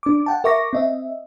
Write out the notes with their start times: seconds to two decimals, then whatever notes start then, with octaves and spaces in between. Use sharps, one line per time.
0.03 D4 D6
0.26 F#5 G5 A5
0.44 A#4 E5 C#6 D6 A#6
0.73 C4 D#5 E5